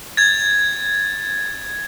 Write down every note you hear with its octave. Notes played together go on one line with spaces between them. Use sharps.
G#6 A6